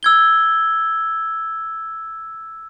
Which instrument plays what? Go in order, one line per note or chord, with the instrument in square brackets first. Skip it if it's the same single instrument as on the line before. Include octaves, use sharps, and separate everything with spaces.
[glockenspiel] E6 G#6 G7